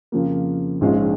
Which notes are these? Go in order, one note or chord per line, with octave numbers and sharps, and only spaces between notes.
F2 C#3 F3 A#3
A#1 G#2 G#3 C#4 F4